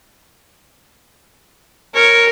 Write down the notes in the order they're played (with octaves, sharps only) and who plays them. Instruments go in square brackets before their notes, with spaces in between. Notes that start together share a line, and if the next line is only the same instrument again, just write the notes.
[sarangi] A#4 [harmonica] C#5